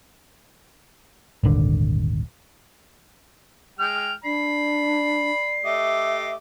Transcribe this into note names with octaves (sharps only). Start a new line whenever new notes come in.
D#1 G#1 D3
G#3 G5 F6 F7
D4 D5 B5 C7
A3 G4 D#5 E5